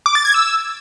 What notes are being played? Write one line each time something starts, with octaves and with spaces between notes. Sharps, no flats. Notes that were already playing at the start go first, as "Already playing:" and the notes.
D6
A6
G#6
E6